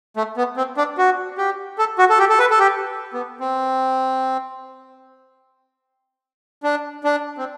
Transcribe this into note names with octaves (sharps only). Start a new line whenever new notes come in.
A3
B3
C4
D4
F#4
G4
A4
F#4
A4
G4
A4
B4
A4
G4
B3
C4
D4
D4
C4